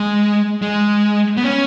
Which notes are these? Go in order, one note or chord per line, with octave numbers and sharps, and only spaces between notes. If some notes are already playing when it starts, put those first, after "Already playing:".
Already playing: G#3
G#3
B3
C#4